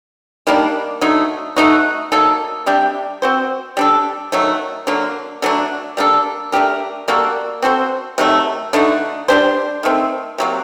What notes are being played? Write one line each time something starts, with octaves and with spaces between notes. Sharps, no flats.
D#3 G3 A#3 D4
D3 F#3 A3 D#4
A3 D#4 F#4
F#3 A#3 D#4 A4
C3 G3 D4 G4
C4 F#4 C5
G3 D4 A4
D#3 F#3 A3
D3 F#3 A#3
D3 F#3 A3 D4
G3 A#3 D4 A4
A3 D4 G4 A#4
G3 A#3 F#4 A4
C4 F#4 A4 C5
C3 D#3 F#3 A3
D3 A3 D#4 F#4
G3 D4 G4 C5
D#3 A3 C4
C3 F#3 A#3